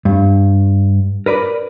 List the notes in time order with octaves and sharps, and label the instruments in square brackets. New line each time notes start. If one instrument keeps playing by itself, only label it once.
[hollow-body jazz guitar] G2
A#4 B4 D5